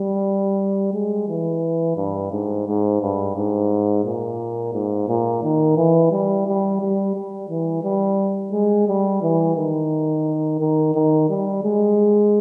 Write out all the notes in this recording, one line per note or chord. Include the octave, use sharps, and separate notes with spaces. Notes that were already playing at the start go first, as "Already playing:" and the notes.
Already playing: G3
G#3
E3
G2
G#2
G#2
G2
G#2
A#2
G#2
A#2
D#3
E3
G3
G3
G3
G3
E3
G3
G#3
G3
E3
D#3
D#3
D#3
G3
G#3